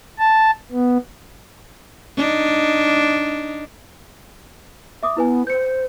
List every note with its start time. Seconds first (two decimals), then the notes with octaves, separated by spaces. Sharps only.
0.18 A5
0.72 B3
2.17 D4 D#4
5.03 E5 D6 D#6
5.17 B3 E4 B4 G#5
5.47 C5 G6 C#7